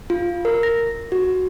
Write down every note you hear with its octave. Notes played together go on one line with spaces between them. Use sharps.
F4
A#4
A#6
F#4